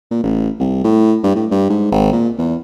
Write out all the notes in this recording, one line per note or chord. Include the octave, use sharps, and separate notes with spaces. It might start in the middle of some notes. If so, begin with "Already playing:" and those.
A#2
A1
C2
A2
G2
A2
G2
G#2
G#1
A#2
E2